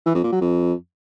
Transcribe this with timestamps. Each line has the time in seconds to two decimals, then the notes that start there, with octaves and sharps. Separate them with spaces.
0.06 E3
0.15 F2
0.23 A#2
0.32 F#3
0.41 F2